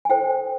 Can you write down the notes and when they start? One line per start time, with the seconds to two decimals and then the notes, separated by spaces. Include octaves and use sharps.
0.05 G#5
0.09 E4 A4 C5 G5